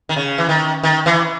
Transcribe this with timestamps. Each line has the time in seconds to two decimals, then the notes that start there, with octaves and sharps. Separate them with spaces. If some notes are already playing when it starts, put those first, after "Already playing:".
0.09 D#3
0.16 C#3
0.38 E3
0.49 D#3
0.83 D#3
1.06 E3